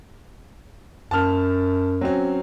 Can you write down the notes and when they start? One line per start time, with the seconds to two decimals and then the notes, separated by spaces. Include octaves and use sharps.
1.11 F#2 A5 F6
2.01 F#3 C4 C#4